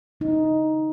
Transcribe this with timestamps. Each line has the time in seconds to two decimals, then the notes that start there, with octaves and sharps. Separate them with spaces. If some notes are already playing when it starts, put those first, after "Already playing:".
0.20 C#3 D#4